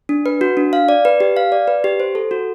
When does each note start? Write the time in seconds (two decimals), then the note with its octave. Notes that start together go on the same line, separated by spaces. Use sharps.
0.09 D4
0.26 B4
0.41 F#4
0.57 D4
0.73 F5
0.89 D5
1.05 B4
1.20 G4
1.37 F5
1.52 D5
1.68 B4
1.84 G4
2.00 C5
2.15 A4
2.31 F#4